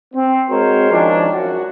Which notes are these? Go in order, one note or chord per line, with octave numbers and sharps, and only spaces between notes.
C4
G#3 C4 F#4 A#4 C5 C#5
D#3 F3 G#3 C#4 D4
F#2 F#4